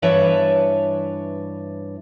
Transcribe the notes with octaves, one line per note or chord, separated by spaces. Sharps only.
G2 E3 D4 B4 C#5 E5